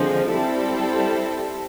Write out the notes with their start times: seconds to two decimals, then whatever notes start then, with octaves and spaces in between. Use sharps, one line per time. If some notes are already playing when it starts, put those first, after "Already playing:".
Already playing: D3 F3 G#3 C4
0.29 G3 C4 E4 A4